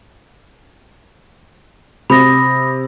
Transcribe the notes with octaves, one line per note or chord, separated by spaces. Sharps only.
C3 B5 D#6 A#6